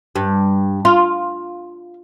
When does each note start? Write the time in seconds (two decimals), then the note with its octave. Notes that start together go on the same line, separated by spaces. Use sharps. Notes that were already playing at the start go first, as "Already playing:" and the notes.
0.16 G2
0.85 F4